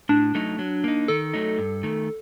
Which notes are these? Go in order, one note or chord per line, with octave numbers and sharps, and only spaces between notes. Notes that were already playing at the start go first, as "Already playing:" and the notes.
A2 D4
F#3 A3 D#4
F#3
A#3 D#4
D#3 A4
F#3 A3 D#4
G2
D#3 A3